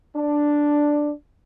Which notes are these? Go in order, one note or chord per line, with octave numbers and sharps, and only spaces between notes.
D4